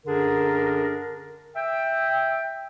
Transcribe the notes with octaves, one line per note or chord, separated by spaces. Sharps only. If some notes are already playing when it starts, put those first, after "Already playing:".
F#2 D3 D4 G#4 A#4
E5 G5